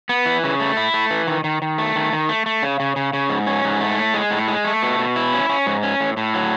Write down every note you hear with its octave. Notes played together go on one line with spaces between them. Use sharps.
B3
E3
C#3
A3
E4
A3
E3
D#3
D#3
D#3
A3
D#3
D#3
A3
A3
C#3
C#3
C#3
C#3
G#2
C#4
G#2
A3
A2
G#3
A2
G#3
A3
B2
B2
E4
C#4
C#4
G#2
C#4
A2
A2
F#3